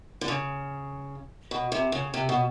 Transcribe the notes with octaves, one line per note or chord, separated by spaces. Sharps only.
D3
C#3
B2
C3
C#3
C3
B2